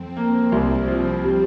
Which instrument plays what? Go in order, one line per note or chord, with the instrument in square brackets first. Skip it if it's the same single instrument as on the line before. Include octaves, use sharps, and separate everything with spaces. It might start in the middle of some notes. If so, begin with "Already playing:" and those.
Already playing: [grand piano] F2 [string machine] C4
[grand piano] A#3
C2
F3
G3